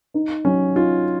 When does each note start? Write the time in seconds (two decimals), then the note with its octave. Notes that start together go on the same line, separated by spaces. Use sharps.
0.14 D#4
0.44 F#3 C#4
0.75 D#4 F4